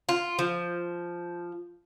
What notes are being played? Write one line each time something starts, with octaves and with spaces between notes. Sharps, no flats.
F4
F3